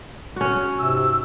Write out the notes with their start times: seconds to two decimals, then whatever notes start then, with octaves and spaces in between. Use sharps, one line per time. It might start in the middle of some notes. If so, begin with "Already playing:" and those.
0.36 C#4 F#4
0.78 G#2 C3 E6